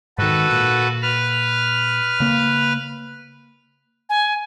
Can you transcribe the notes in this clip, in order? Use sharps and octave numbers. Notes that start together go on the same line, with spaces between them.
G#2 D#3 F#4 A4 B4
A#2
B4 F6
C#3 A#3
G#5